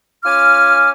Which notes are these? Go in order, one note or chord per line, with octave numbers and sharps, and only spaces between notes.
C#4 F4 G#5 D6 F6